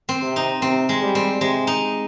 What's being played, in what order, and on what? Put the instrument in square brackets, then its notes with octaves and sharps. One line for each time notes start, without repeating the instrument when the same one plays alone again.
[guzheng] C4
[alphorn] C3
[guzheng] D#4
[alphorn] C3 [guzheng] C4
[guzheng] G#3
[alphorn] G3
[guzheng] C4
[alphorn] C3 [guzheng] G#3
[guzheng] D#4